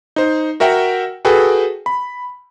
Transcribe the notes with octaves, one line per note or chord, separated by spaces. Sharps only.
D#4 C5
F#4 A#4 E5 F#5 G5
F#4 G#4 A4 B4 G5
B5